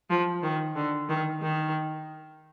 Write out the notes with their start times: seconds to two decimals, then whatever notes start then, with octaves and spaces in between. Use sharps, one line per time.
0.10 F3
0.43 D#3
0.76 D3
1.09 D#3
1.42 D#3